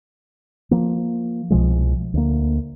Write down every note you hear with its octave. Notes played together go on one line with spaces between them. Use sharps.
F3 A#3
C2 B2 F3 G#3
D2 A#3